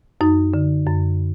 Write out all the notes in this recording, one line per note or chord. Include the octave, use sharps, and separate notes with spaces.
F#2 D#4
D3
F#2